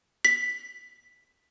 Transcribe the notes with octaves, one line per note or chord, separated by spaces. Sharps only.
B6